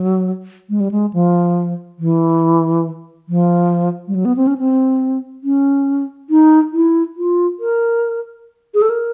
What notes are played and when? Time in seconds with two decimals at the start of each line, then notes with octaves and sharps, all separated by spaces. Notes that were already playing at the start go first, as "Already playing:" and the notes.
Already playing: F#3
0.70 G#3
0.80 G3
0.91 G#3
1.13 F3
1.99 E3
3.29 F3
4.08 G3
4.15 F#3
4.25 B3
4.36 C4
4.47 C#4
4.58 C4
5.44 C#4
6.30 D#4
6.73 E4
7.17 F4
7.60 A#4
8.74 G#4
8.82 A4
8.90 A#4